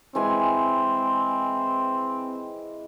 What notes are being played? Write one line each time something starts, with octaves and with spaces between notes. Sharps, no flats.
E3 G#3 C4 G#5